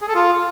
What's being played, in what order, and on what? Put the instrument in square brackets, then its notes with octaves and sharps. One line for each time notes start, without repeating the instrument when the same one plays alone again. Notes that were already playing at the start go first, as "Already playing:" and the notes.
[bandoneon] G#4
A4
F4